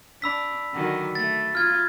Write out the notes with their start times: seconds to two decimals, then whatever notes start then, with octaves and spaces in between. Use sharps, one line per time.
0.22 D4 B5 E6 B6
0.73 D3 D#3 F#3
1.15 A3 A6
1.55 F4 F6 G#6